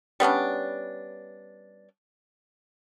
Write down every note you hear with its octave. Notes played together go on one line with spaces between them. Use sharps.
G3 B3 C#4 D4